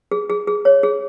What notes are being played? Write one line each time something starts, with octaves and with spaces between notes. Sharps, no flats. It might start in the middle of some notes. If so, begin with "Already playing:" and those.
G#4
G#4
G#4
C#5
G#4